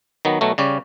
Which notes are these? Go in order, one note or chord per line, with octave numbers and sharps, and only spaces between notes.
D#3 F#3 B3
B2 F#3 A3
C#3 G3 C#4 D5